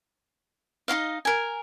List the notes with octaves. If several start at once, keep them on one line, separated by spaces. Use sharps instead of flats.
D#4 E4 D#5 F5
A#4 G#5